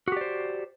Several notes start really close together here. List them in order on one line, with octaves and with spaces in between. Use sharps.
F#4 G4 D5 C5